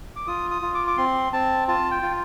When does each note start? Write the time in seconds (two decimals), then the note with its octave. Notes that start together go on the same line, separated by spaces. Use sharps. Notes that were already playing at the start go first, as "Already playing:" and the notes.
0.16 D6
0.27 F4 D#6
0.51 D#6
0.62 F4
0.75 D6
0.87 D6
0.97 C4 C6
1.32 C4 A5
1.68 F4 A5
1.91 G5
2.02 F4